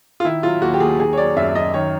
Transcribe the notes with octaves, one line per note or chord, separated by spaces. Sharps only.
F4
D#3 E4
F#3 F4
D#2 F#4
G4
D#2 G#4
D#3 G#4
C#5
F#3 D5
F#2 E5
F#2 D#5
D#3 C#5